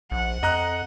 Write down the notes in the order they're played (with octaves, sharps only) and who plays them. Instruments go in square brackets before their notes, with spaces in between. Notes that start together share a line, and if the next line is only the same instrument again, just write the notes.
[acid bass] A#1 [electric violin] F#5
[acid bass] F2 [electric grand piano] D#5 A#5 F#6